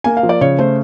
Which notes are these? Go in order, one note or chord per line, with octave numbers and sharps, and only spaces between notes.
A#3 G#5
F5
F3
D5
C#3 C#5
A3 C5